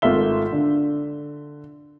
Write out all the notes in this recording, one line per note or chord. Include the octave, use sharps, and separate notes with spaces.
G#1 A3 F4 E5 G7
D3